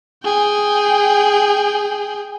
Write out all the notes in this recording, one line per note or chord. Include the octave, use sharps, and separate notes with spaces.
G#4 G5